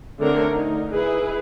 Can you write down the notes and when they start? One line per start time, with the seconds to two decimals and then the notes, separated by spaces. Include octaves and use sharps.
0.21 D3 A3 C4 A#4 C#5
0.50 D#4
0.92 E4 G#4 B4